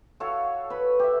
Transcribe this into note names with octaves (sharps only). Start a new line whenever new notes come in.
F#4 A4 C#5 F5
B4 B5
G4 E5